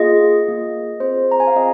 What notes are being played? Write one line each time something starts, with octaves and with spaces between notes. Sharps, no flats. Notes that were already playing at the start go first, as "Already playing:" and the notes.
Already playing: A#3 F4 G#4 D#5
A#3 F4 G#4
C4 F4 G#4 C5
A#5
G#5
F5
C4 F4 G#4 D#5